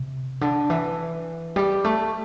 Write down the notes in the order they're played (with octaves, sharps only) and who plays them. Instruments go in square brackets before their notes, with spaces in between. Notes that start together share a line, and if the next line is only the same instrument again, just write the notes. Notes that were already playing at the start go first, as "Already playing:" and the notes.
Already playing: [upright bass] C3
D3
E3
G3
A3